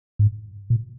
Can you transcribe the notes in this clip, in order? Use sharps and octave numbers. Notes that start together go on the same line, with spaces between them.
G#2
A#2